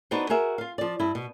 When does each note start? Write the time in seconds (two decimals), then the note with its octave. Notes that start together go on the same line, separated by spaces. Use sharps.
0.11 B3 D4 D#4 F#4 C5
0.30 F#4 G#4 A#4 E5
0.58 F4 F5
0.78 F3 D5
1.00 G2 E4
1.15 B2